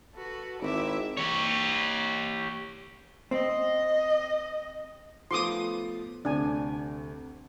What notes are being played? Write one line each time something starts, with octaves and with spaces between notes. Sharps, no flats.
F#4 A4 B4
G#1 E4 E5 D6
G4 C#5
C4 D#5
F3 A3 B3 C6 D6 D#6
D2 C3 D4 G#5